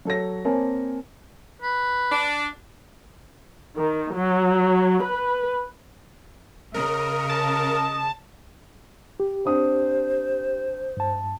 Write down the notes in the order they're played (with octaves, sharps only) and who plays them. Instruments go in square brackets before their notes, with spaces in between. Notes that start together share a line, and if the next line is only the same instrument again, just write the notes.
[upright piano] F#3 A4 C#5 A#6
A#3 C4 A#4 C#5 G#5 A5
[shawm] B4
[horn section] D4
[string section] D#3
F#3
B4
[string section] C#3 [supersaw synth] A#4 [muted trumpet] D#5
[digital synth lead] A5
[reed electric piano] G4
[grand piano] C4 D4 D#6 [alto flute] C5
[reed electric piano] G2 A5